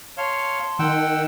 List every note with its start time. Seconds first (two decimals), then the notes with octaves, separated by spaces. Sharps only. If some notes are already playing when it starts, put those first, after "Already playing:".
0.17 C#5 F5 A5 C6
0.79 D#3 F#5 G5 E6